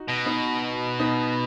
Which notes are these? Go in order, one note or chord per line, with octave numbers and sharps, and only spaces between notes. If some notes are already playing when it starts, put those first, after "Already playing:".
Already playing: D#4 F#4
B2
B3 D#4
B3 D#4